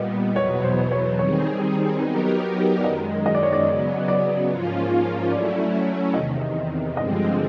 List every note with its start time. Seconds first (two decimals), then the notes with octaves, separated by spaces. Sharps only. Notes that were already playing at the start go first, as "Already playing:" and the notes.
Already playing: A#2 G3 B3 D#5
0.36 E2 B2 F#3 B3 C#5
0.64 C5
0.92 C#5
1.19 D#3 G3 C4 D#4 G#4 C#5
2.01 F#3 B3 D#4 G4 A#4 B4
2.77 D5
2.84 F#2 D#3 G#3 D#5
3.26 D#5
3.35 D5
3.43 C#5
3.53 D5
3.67 C#3 F#3 B3
4.08 D5
4.49 G#2 F3 A#3 C#4 F4
5.31 F#3 A3 C#4 E4 D5
6.14 E2 C3 D#3 D#5
6.96 G2 D3 F3 G#3 C4 D#5